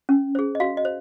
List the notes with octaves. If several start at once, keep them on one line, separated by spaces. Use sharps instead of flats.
C#4
G#4 C5
D#5
F#4 F5
D#5
C5